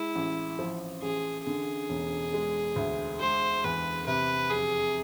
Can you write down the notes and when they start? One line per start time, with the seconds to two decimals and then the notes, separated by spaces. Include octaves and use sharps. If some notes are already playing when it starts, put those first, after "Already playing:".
Already playing: G#3 E4
0.16 A1
0.59 F3
1.02 A1 G#4
1.46 D3 G#4
1.89 E1
2.34 G#3
2.76 D2
3.20 G#3 C5
3.64 E2 B4
4.07 C3 B4
4.50 F1 G#4